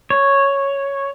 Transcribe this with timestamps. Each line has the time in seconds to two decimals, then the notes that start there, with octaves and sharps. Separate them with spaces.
0.10 C#5